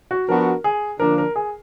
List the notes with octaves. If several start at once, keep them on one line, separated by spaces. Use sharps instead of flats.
F#4
F3 B3 D4 F#4 A#4
G#4
D3 F3 A#3 D4 A#4
A#4
G#4